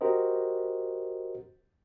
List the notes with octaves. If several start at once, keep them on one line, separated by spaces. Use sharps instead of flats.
F#4 G4 A#4 C5 D#5